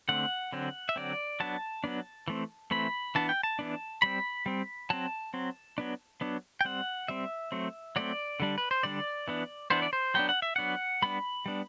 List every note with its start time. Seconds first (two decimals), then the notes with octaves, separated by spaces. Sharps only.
0.09 D3 A3 C4 F#5
0.52 D3 F#3 C4
0.89 E5
0.96 D3 F#3 C4 D5
1.40 F#3 B3 D4 A5
1.84 F#3 B3 D4
2.28 E3 A3 C4
2.71 E3 A3 C4 B5
3.15 E3 B3 D4 A5
3.29 G5
3.43 A5
3.59 E3 B3 D4
4.02 G3 C4 B5
4.46 G3 C4
4.90 F#3 C4 A5
5.34 F#3 C4
5.78 F#3 B3 D4
6.21 F#3 B3 D4
6.61 G5
6.65 G3 C4 F#5
7.08 G3 C4 E5
7.52 F#3 A3 C4
7.96 F#3 A3 C4 D5
8.40 D3 G3 D4
8.58 B4
8.71 C5
8.83 D3 G3 D4 D5
9.28 E3 B3 D4
9.70 E3 B3 D4 C5
9.82 D5
9.93 C5
10.14 F#3 B3 D4 G5
10.29 F#5
10.42 E5
10.56 F#3 B3 D4 F#5
11.02 G3 B3 D4 B5
11.46 G3 B3 D4